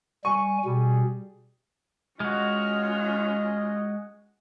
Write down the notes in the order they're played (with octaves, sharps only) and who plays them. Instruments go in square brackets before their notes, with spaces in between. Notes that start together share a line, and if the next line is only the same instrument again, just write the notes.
[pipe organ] G3 G#5 [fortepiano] C#6
[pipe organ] B2 [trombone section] G3 G#4
[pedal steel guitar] G#3 F#4 [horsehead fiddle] C#4 F4 [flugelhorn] D#5 [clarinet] F6